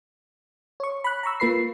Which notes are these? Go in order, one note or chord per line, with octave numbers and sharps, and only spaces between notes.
C#5 C#6
B5 F#6
A#5 B5 C#6 E6
A#3 F4 B4 B5 C7